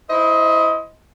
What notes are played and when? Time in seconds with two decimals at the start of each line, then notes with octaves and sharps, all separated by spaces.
0.09 E4 C5 D#5